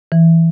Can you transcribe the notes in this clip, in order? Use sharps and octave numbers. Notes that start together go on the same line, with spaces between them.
E3